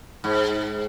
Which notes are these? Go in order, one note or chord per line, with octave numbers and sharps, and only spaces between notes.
G#2